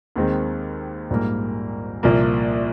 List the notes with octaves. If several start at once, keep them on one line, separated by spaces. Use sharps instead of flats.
D#2 D#3 G#3 C4
A#1 G#2 G3 A#3
C2 A#2 F3 A#3